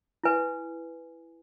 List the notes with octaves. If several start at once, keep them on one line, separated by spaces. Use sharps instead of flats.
E4 B4 G#5